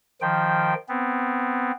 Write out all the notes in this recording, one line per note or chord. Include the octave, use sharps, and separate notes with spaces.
D#3 F3 G5
B3 C4